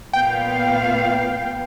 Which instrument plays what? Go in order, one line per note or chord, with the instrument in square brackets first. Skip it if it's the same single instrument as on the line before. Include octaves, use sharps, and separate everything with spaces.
[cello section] A#2 B3 F5 [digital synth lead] G5